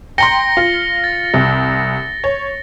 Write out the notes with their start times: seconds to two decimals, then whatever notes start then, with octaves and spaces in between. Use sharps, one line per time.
0.18 G5 A#5 C6 A#6 C#7 G7
0.57 F4
1.04 A6
1.34 C2
2.24 C#5